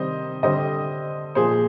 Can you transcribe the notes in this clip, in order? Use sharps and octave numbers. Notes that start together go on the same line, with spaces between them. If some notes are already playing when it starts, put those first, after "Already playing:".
Already playing: C3 D#3 G3 C5 D#5
D3 G3 C5 D#5
A#2 F3 G#4 C5